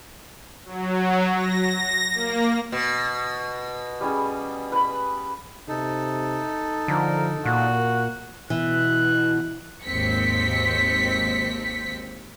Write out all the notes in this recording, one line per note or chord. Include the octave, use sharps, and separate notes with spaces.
F#3
A#6
A#3
B2
G3 C#4 G#4
B4 B5
C3 D#4 A4
D3 F3 A#4
A#2 A#3 F#4
B2 E3 F#6
G#1 D#2 C4 B6 C#7